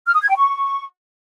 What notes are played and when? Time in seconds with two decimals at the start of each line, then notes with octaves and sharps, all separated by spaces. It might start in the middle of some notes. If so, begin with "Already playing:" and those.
0.07 F6
0.14 D#6
0.21 G#6
0.29 G5
0.36 C#6